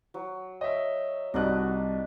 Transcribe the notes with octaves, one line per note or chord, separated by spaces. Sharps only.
F#3
C#5 D#5 E5
C2 C4 D4 D#4 F#4 D#6 F#6